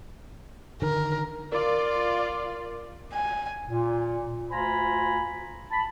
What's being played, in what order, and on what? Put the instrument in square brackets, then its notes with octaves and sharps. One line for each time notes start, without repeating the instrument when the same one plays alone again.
[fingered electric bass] D3 D#3 [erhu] A#4
[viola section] F4 D5 [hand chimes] A#4
[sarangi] G#5
[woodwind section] A#2
D2 F4 C5 G#5 A#5 B5
A5 B5